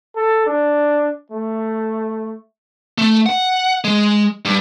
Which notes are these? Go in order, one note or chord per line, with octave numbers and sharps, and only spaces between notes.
A4
D4
A3
A3
F#5
G#3
G2